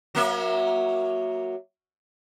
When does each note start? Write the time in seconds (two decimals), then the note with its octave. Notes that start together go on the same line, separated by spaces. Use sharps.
0.15 F#3 A#3 E5